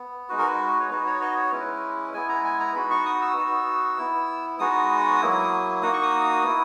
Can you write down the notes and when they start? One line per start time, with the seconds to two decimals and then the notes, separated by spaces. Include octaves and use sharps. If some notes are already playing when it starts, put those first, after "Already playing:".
Already playing: B3
0.29 G#3 D#4 F#4 B4
0.39 A#4
0.48 B4
0.80 C#5
0.90 B3 D#4 F#4 B4
1.06 C#5
1.22 D#5
1.37 C#5
1.52 G#3 C#4 E4 B4
2.14 G#3 B3 E4 G#5
2.29 A#5
2.45 G#5
2.60 A#5
2.75 B3 D#4 F#4 B5
2.91 C#6
3.06 D#6
3.22 E6
3.37 B3 D#4 F#4
3.98 B3 E4
4.59 G#3 B3 D#4 F#4 D#6
5.21 F#3 A#3 E4
5.82 A#3 D#4 F#4 D#6
5.93 C#6
6.03 D#6
6.44 B3 E4